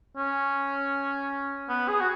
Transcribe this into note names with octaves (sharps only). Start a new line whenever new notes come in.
C#4
B3
G#4
F#4